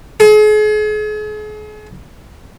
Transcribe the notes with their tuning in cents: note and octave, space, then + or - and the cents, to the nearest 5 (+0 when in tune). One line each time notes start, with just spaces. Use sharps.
G#4 +40